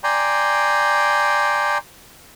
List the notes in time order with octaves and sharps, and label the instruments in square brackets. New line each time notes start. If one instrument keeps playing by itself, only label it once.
[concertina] D5 G5 G#5 A#5 C6